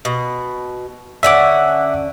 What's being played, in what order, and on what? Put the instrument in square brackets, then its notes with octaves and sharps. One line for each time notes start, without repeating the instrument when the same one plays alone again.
[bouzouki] B2
[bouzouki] D3 C#4 F#5 [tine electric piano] E5 D6